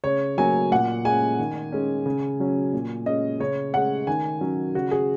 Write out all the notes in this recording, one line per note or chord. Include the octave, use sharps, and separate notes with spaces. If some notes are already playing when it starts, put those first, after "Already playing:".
C#3 C#5
F#3 A#3 G#5
A#2 F#5
G#3 C#4 G#5
D#3
G#3 C#4
C#3
F#3 C#4
A#2
G#3 C#4 D#5
C#3 C#5
G#3 C#4 F#5
D#3 G#5
F#3 C#4
C#3 F#4
G#4